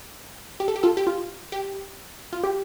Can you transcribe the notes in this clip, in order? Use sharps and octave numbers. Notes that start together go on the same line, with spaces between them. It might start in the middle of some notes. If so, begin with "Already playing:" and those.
G4
A4
G4
F4 A4
G4
F4
G4
F4
G4